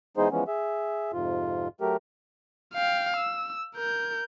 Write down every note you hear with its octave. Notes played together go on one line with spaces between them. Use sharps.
E3 G#3 B3 D#4 G#4 C5
E3 F3 G#3 B3 C#4
G#4 E5
F2 G#2 C3 F4
F#3 A3 G4 A#4
F5 G5
E6
A#4 G6